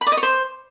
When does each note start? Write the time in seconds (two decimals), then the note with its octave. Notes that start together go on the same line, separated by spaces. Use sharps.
0.01 B5
0.07 D5
0.12 D#5
0.17 C#5
0.23 C5